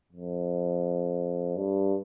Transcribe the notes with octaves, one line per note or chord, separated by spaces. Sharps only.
F2
G2